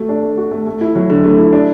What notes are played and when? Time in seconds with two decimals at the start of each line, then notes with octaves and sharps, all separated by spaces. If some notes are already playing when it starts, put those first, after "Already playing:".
Already playing: A3 F#4
0.09 D4
0.23 A3
0.38 F#4
0.51 A3
0.67 A3
0.81 E4
0.96 F#3
1.10 D3
1.24 A3
1.38 E4
1.53 D4